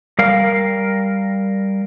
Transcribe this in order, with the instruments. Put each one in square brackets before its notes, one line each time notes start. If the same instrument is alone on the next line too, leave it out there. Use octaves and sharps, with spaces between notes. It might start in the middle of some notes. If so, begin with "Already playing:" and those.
[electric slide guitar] G3 A#4 F5